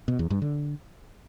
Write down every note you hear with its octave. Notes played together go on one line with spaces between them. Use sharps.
B2
E2
G2
D3